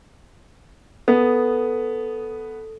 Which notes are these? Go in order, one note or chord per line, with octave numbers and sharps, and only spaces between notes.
B3 A4